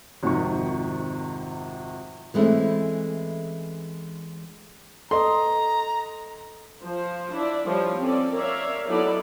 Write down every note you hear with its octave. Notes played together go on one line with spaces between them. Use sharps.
G#1 F2 C3 D#3 C#6
E3 G#3 A3 C4 C#4 E4
A4 D#5 A#5 C6
F3 C5
D4 E4 D5
F3 G3 C5 C#5
C4 C#4 A4 D5
A#4 C#5 D5 E5 F5
F#3 B3 D#4 E4 A4 D5